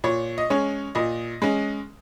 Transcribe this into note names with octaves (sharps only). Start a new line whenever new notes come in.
A#2 C#5
D#5
G#3 C#4 C#5
A#2 D#5
G#3 C#4